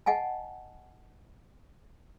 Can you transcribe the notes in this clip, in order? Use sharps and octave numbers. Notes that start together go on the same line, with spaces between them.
D#5 F#5 G#5 A5